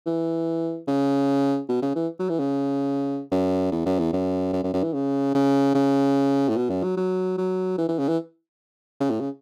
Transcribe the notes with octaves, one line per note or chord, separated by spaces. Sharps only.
E3
C#3
B2
C#3
E3
F#3
E3
C#3
F#2
E2
F#2
E2
F#2
F#2
F#2
F#2
E3
C#3
C#3
C#3
A2
B2
F#2
F#3
F#3
F#3
E3
E3
C#3
E3
C#3
A2
C#3